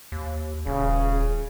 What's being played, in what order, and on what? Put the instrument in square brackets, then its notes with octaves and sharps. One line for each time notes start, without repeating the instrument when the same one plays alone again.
[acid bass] D#2
[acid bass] D#1 [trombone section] C#3